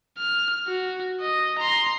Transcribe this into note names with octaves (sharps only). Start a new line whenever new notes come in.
F6
F#4
D#5
A#5 C6